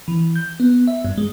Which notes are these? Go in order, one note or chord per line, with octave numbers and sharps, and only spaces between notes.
E3
G6
B3
E5
G2
G#3